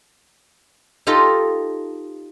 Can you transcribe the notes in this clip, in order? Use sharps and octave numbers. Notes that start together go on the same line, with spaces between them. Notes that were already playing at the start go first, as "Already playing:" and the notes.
D#4 F4 G4 A4 D#5